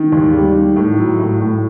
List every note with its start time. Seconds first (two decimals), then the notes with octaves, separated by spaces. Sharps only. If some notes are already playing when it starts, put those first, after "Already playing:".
Already playing: D#3
0.12 D#2
0.33 G3
0.55 D#3
0.76 A2
0.98 F#3
1.20 A2
1.41 A2